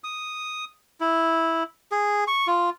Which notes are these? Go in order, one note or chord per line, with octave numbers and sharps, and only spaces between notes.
D#6
E4
G#4
C#6
F4